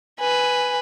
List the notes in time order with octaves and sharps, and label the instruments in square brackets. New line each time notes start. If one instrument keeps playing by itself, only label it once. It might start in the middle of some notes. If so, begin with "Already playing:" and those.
[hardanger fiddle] B4 [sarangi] G#5